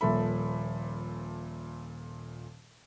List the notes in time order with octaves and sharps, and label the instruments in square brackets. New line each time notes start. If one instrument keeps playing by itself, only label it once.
[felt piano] D#1 A#2 F3 A4 E5 B5